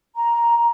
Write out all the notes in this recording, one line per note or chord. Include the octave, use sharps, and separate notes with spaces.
A#5